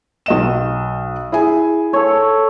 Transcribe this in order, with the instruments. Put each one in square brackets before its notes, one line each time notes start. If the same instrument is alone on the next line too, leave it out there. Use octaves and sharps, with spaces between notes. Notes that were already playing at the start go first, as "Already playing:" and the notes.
[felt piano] B1 D#5 E7
E4 G#4 G#5
[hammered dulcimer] A4 C#5